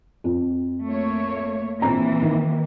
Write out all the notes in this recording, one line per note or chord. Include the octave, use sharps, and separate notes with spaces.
F2
A3 A#3 C#5
A#1 E3 A#3 C4 A#5
D#3